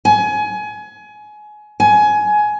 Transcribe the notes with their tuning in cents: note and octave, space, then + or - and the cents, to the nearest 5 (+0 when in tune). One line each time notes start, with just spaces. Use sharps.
G#5 +25
G#5 +20